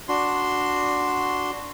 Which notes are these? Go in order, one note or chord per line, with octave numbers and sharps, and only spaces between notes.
D4 F#4 C6